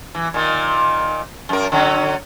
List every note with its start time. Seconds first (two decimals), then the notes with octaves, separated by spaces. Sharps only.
0.15 E3
0.34 A#2 D#3
1.49 F#2 A#4
1.72 D3 F#3 C#4